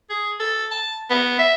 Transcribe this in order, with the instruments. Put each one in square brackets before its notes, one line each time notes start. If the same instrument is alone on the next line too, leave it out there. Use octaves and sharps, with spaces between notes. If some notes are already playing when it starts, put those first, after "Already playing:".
[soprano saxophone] G#4
A4
A5
B3
E5